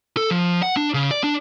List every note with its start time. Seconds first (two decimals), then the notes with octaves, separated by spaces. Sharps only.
0.17 A4
0.31 F3
0.63 F#5
0.77 D4
0.94 C#3
1.11 D5
1.24 D4